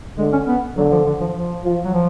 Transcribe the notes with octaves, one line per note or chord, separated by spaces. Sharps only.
D3 G#3
C#4
B3
D3 F#3
F3
D3
F3
F3
F3
F#3
F3